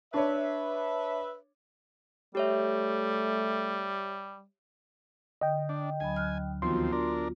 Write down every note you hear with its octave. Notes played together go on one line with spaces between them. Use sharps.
D4 B4 C#5 E5
G3 A3 G4 C#5 E5
D3 D#5 G5
D4
D2 F#3 G#5 B5
F6 F#6
D#2 F3 B3 C4 F4 F#4 C6
D4 F4 A#4